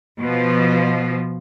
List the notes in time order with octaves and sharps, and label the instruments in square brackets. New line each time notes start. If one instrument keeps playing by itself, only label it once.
[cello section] B2 F3